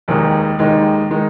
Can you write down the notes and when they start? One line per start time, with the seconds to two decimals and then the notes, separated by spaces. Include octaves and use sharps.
0.08 F1 D#2 D#3 G#3 D#4
0.59 F1 D#2 D#3 G#3 D#4
1.10 D#3 G#3 D#4